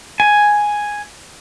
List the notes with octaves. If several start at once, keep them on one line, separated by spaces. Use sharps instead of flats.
G#5